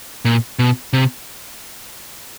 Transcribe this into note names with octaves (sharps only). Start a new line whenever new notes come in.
A#2
B2
C3